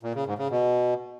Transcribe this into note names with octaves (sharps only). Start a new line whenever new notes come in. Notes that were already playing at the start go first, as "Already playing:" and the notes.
A#2
C#3
G#2
C#3
B2